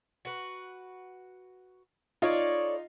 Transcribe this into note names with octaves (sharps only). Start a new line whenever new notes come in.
F#4 B4
D#4 F4 A4 C#5 D5